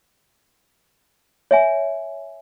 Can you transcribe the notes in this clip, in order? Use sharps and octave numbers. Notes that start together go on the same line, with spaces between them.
C#5 E5 G#5